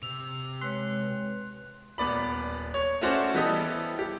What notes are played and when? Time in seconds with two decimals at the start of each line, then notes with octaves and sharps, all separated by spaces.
0.03 C3 E6 F7
0.61 G#3 B4 C#5 C6 F#6
1.98 D#1 B3 D5 B5
2.74 C#5
3.01 A3 C#4 F#4 C5 D5
3.34 E3 G3 B3 G4 A4 D#5
3.99 G4